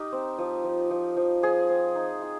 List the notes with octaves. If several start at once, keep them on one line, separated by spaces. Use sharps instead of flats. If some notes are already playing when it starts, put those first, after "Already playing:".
Already playing: D#4 G4 A#4
C4
F3
F3
F3
F3
F3 G#4
C4
D#4
F4